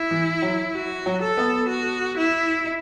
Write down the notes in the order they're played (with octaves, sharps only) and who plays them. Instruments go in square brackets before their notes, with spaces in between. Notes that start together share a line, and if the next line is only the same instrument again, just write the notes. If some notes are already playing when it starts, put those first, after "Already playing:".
Already playing: [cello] E4
[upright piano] E3
F#3
[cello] F#4
[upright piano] F#3
[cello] A4
[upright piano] B3
[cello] F#4
E4